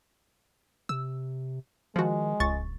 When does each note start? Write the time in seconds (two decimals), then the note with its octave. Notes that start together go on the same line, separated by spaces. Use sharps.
0.89 C3 E6
1.96 D#3 F3 G#3 F#4
2.40 D1 C#2 C#6 A6